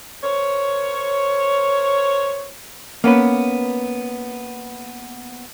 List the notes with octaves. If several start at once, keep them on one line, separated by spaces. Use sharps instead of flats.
A#4 C5 C#5
A#3 B3 C#4 B4